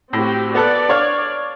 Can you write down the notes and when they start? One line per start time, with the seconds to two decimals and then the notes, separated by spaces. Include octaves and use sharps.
0.13 A2 C4 F#4 G4
0.55 B3 A4 D5 F#6
0.89 D4 C#5 F5